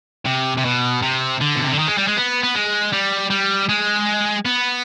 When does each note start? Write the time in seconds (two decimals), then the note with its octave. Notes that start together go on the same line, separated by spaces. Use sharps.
0.26 C3
0.58 C3
0.65 B2
1.02 C3
1.41 D3
1.56 B2
1.64 C3
1.71 D3
1.79 D#3
1.88 G#3
1.98 G3
2.07 G#3
2.16 B3
2.44 B3
2.55 G#3
2.93 G3
3.30 G3
3.69 G#3
4.46 B3